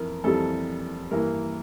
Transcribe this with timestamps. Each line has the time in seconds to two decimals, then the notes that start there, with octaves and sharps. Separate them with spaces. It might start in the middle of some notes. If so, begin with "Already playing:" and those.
Already playing: F2 E3 A#4
0.24 F2 E3 G3 A4
1.11 G2 E3 A#3 A#4